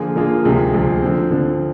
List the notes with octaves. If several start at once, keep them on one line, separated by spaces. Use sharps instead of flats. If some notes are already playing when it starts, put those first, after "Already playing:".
Already playing: D3 F3 A#3 F4 G#4
D3 F3 A#3 F4 G#4
D2 C3 F3 G#3
D2 C3 F3 G#3
D3 F3 C4
D3 F3 C4